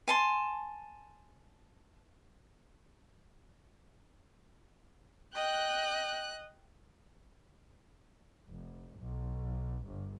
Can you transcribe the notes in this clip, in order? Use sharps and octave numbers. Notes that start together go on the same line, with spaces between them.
G#5 A5 C6
D#5 G5 F#6
F1
B1
G1